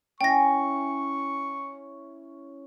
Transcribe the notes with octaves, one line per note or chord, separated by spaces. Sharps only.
C#4 E4 G5 C#6 A#6